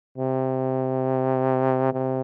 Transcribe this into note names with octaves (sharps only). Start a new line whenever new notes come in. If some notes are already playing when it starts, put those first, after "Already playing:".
C3
C3